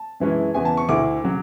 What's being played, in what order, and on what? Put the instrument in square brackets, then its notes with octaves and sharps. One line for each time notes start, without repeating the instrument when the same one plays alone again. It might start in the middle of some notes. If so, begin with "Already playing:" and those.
Already playing: [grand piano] A5
F#2 E3 G#3 C#4 E4
E2 C#3 E3 G#5
A5
C#6
D2 D3 A3 E4 D6
C#3 F#3